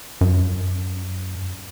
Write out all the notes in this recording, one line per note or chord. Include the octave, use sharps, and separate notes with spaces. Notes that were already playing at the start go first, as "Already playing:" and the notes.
F#2